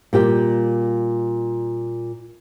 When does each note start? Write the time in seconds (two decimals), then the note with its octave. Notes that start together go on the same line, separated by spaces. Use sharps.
0.13 A#2 G3 G4